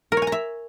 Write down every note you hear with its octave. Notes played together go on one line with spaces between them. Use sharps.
A#4
C#5
G#5
A#5
E5